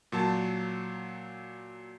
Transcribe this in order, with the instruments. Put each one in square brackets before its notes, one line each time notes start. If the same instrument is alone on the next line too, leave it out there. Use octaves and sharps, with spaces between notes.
[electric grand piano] A#2 F#3 A5